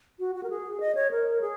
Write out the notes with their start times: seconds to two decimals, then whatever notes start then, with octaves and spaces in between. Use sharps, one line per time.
0.19 F#4
0.35 F#4
0.43 A#4
0.50 G#4
0.80 D#5
0.95 C#5
1.11 A#4
1.41 G#4